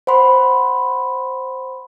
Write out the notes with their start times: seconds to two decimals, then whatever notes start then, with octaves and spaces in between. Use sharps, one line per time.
0.07 C5 F#5 B5 C6